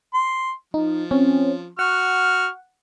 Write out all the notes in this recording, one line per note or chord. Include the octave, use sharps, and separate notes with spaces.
C6
F3 D#4
C4 C#4
F#4 F#5 C#6 F6